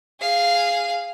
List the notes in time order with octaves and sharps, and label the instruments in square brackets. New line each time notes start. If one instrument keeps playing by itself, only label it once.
[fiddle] G#4 F5